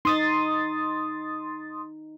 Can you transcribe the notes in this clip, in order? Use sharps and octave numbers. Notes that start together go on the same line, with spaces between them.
D#4 C6 D#6 A6